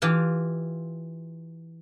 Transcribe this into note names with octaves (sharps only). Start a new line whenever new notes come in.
E3 F4 G4 A5